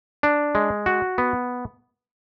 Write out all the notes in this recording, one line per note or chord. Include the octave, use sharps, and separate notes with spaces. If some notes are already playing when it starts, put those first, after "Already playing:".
D4
G#3
F#4
B3